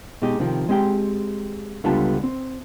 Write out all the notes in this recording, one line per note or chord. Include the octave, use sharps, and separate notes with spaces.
B2 G#3 D#4 G4
C3 D#3 F3 C4
G#3 C4 G4 G5
C#2 D3 G3 B3 F4 A5
C4